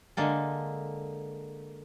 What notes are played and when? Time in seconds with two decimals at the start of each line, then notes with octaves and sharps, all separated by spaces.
0.17 D3 G#3 A#3 A4